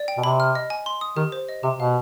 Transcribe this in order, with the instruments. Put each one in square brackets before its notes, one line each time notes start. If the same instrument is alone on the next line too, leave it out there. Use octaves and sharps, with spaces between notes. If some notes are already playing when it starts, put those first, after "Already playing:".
Already playing: [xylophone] D5
G5
[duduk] B2
[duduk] C3 [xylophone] B5
[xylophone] F6
D#5
G#5
C6
D#6
[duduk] D#3 [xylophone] G4
[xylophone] C5
D#5
[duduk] C3 [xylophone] G4
[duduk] B2 [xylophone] F5